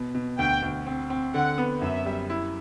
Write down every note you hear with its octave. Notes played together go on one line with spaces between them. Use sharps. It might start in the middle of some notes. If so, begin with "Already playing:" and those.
Already playing: B2
B2
D2 G5
D2
C4
C4
D3 F#5
B3
F#2 E5
G3
E4